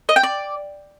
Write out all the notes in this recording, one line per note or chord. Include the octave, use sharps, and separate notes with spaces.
D#5
G5
D5